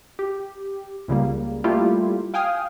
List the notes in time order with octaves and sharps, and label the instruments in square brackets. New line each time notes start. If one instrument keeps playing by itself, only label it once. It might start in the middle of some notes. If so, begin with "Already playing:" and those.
[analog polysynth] G4
C#2 C#3 G3 A#3
G3 A3 A#3 E4 F4 G4
F5 G5 G#5 D#6 F6